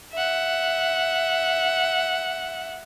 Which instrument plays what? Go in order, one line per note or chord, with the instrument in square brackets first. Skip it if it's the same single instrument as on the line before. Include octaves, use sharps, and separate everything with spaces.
[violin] E5 F#5